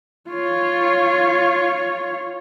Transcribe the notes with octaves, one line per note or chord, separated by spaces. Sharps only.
F4 C#5